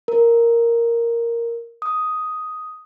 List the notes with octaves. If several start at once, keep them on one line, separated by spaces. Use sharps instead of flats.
A#4
D#6